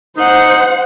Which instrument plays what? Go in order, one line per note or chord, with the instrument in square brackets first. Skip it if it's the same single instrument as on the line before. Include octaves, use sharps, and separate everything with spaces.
[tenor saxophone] D#4 [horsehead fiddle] C5 F#5